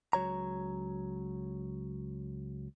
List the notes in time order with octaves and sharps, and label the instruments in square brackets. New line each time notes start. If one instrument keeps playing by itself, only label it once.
[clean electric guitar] C#2 F#3 C#5 A#5